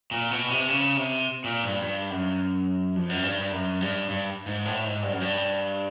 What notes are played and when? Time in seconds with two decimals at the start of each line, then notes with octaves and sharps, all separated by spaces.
0.11 A#2
0.31 B2
0.50 C3
0.69 C#3
0.97 C3
1.44 A#2
1.63 G2
1.82 G2
2.10 F#2
2.96 F2
3.10 F#2
3.24 G2
3.38 G2
3.52 F#2
3.81 G2
4.09 G2
4.46 G#2
4.65 A2
4.84 G#2
5.02 G2
5.12 F#2
5.21 G2